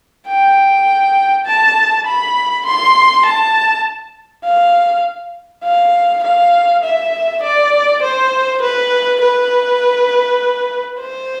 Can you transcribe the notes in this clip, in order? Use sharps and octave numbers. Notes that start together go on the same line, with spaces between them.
G5
A5
B5
C6
A5
F5
F5
F5
E5
D5
C5
B4
B4
C5